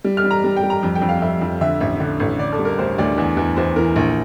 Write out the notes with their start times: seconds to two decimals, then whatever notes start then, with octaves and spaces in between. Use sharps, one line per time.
0.04 G3
0.17 F6
0.24 G3
0.31 A#5
0.44 G3
0.56 G5
0.63 G3
0.70 A#5
0.83 F2
0.95 G5
1.02 F2
1.09 F5
1.22 F2 E5
1.41 F2
1.61 D3 E5
1.80 A1 E5
2.00 D3
2.20 A1
2.39 D3 D5
2.52 A4
2.59 G3
2.65 A#4
2.78 D2 C5
2.98 D2 D5
3.18 E2
3.37 E2
3.56 E2 C5
3.76 E3 A#4
3.96 A#1